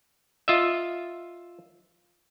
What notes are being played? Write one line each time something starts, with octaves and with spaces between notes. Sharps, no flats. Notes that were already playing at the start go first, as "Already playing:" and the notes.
F4 D#5 E5